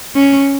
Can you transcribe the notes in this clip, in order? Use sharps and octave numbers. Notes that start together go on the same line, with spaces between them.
C#4